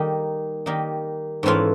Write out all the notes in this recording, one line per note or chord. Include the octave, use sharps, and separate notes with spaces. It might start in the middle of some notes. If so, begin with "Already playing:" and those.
Already playing: D#3 G3 A#3 D#4
D#3 G3 A#3 D#4
G#2 E3 A3 C#4 E4 F4